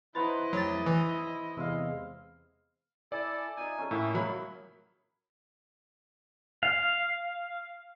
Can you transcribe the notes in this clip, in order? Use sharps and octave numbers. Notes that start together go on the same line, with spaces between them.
E4 B4 C5 D#5 F#5 A#5 B5 A6
F2 F#3 A3 G4 A6
E3 E6
E2 C3 G#3 F5 E6
E4 A4 D5 G#5
D#4 F4 E5 G#5
C#4 A4
A2 A#3 E4 E5
F#3 A#4 B5
F5